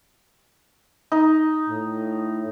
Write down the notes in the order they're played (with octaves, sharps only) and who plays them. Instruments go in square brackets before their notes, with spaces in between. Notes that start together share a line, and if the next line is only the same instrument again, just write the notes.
[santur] D#4
[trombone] A2